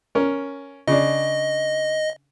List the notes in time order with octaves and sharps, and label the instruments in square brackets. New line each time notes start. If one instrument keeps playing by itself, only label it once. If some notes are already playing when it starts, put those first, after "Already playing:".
[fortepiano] C#4 A#4
[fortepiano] C#3 D4 [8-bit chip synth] D#5